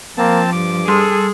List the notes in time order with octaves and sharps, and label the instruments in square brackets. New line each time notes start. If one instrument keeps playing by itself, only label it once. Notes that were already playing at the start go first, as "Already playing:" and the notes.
[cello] F3 [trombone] A#3 [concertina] C4 A5
[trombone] G2 [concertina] D6
[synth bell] G3 C6 [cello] G#4 [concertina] A4